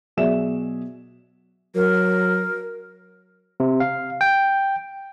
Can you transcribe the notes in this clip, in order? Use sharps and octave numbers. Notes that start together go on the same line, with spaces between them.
B2 F#3 G#4 D5 E5 E7
F#3 A#4
C3
F5
G5